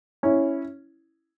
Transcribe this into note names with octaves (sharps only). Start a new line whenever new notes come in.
C#4 E4